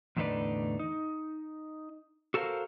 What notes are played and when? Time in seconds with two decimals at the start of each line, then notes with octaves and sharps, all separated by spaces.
0.17 E2 A2 D3 D#4 B4 D5
0.79 D#4
2.34 F#4 A4 A#4 C5 F5